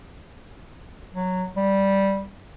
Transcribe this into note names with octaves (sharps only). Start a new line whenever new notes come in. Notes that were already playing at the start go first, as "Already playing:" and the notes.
F#3
G3